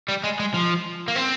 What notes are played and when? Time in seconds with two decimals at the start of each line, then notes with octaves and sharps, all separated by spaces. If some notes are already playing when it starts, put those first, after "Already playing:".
0.08 G3
0.23 G#3
0.39 G#3
0.54 F3
1.08 A#3
1.16 C4